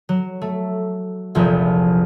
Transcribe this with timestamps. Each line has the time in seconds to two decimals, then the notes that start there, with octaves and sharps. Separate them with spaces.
0.09 F#3
0.42 A3
1.35 F1 A#1 E2 F3 A#3